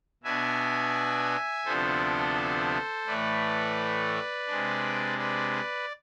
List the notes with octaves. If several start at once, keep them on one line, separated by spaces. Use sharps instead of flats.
B2 B3 D4 E5 G#5
D2 C3 F3 B3 D4 A4 C5
A2 E3 A3 B4 D5
C3 G#3 D4
B4 D5